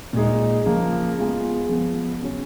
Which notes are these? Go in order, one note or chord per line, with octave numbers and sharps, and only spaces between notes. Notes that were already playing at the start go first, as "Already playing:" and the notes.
A#2 G#3 D#4
C#3 F3 A#3
G#3 B3 F4 G#4
F3 G#3 B3
C#3 F#3 C#4